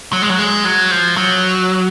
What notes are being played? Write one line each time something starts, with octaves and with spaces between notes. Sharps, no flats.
F#3
G#3
F#3
G#3
F#3
F3
F#3